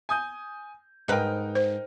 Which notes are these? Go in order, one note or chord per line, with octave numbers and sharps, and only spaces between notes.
G#5 D#6 G6
G#2 D#4 A#4 B4 G5
C5